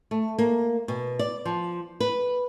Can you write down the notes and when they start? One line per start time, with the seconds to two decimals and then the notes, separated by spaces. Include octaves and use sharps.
0.11 A3
0.39 A#3
0.88 B2
1.19 D5
1.45 F3
2.00 B4